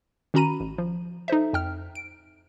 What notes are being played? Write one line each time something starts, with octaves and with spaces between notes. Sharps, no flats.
D#3 C#4 F#4 A#5 B5 D#7
A1
F3
D#4 A4 C5 E5
F2 G5 F6
D7